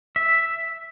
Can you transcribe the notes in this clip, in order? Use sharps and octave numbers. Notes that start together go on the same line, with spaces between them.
E5